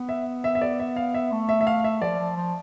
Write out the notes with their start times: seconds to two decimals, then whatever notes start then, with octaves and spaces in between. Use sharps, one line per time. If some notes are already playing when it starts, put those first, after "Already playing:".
Already playing: B3
0.09 E5
0.44 E5
0.55 E5
0.61 D5
0.80 E5
0.96 F5
1.14 E5
1.32 A3
1.49 E5
1.61 E5
1.67 F5
1.84 E5
2.01 F3 D5
2.19 F3
2.36 F3